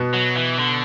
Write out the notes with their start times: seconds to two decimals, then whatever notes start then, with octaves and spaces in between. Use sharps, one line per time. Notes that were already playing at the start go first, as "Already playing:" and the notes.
Already playing: B2 B3
0.14 F#3
0.37 E3
0.59 D3